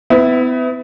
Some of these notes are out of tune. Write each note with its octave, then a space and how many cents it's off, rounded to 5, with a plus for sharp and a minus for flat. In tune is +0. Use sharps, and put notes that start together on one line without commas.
B3 +40 E4 -10